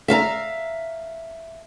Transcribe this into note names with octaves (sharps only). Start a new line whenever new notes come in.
E5 F5 A5 A#5